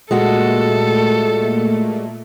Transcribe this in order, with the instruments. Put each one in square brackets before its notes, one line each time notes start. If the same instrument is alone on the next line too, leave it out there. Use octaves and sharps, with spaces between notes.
[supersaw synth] A#2 A3 [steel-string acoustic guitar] G#3 F#4 [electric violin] A4